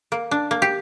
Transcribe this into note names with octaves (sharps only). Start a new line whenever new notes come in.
A#3
D4
A#3
G4